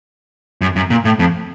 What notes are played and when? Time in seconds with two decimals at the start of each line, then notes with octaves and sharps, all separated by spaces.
0.61 F#2
0.76 F#2
0.90 A#2
1.05 A2
1.19 F2